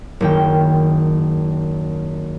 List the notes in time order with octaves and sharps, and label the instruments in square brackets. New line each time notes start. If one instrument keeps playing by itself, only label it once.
[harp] F#1 D#3 G5